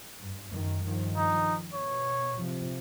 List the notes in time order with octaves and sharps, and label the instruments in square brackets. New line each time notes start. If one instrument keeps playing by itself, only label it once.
[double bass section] G2
F#2 D#3
G2 D#3 F3
[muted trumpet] D#4
[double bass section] B2 [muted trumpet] C#5
[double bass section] C3 F3